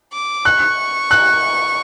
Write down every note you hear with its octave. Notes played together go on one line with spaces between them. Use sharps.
D6
C#6 F#6
F#6